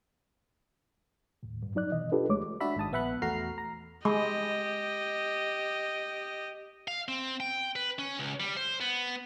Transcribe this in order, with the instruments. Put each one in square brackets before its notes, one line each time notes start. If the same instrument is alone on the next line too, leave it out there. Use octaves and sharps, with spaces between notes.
[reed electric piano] D#2 A2
G2
F#3 D#4 D5 F#6
B2 E3 D#5
D4 F4 G4 A4 B4
D2 G#3 A3 C#5 D6
[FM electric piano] D4 F#4 D5 E5 B5
G#1 G#2 A5 D#6
A#1 B3 E5 F#5 B5 F#6
E2 A3 F#4 A#5 F6 C7
A#5
[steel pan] G#3 [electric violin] G4 D#5
[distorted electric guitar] F5
C4
G5
B4
C#4
C#2
G3
C5
B3